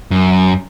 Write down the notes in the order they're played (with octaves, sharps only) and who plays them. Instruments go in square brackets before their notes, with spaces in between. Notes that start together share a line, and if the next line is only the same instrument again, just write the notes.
[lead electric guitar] F#2